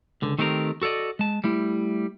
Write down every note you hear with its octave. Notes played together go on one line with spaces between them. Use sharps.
C#2 D3
D#3 A3 C4 G4 A4 A#4
F#4 A4 C5 D5 D#5
G#3 A5
G3 A3 E4